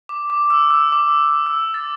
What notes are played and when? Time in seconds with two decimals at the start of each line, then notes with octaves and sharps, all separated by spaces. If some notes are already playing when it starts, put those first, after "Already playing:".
0.09 D6
0.30 D6
0.50 E6
0.71 E6
0.92 D6
1.46 E6
1.74 A6